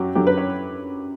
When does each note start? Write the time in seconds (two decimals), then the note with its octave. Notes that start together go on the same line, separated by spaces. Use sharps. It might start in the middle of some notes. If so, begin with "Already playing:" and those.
Already playing: F#2 F#3 F#4 G4
0.15 F#2 D3 F#3 G4
0.27 B4
0.38 C#5